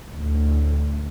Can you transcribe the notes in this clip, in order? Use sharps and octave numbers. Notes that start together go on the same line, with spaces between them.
D2 A2